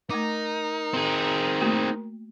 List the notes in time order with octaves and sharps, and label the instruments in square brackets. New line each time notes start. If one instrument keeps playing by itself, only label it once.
[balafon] A3 F#5 D6 [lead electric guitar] D#4 [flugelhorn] A#4
[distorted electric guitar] C4 G#4
[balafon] A3 A#3 F#4